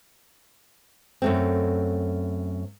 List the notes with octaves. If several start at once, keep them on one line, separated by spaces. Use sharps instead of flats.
F#2 A3 C4